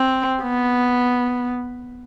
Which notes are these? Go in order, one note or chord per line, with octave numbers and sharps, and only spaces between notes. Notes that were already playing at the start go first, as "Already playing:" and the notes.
Already playing: C4
B3